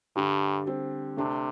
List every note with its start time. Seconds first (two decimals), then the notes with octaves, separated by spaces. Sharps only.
0.16 G2 D3 G3
0.67 G3 C4
1.17 C3 A3 D4